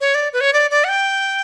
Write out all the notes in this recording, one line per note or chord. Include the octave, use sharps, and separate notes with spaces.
C#5
D5
B4
C#5
D5
D5
F#5
G5